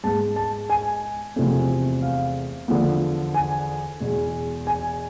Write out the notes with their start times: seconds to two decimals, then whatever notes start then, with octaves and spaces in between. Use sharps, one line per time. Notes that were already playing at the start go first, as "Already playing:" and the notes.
0.04 G#2 G#3 B3 A5
0.36 A5
0.70 G#5
1.36 E2 C3 F3 A3 C4
2.02 F5
2.68 E2 D3 F3 B3
3.34 G#5
4.00 E2 B2 G#3
4.67 G#5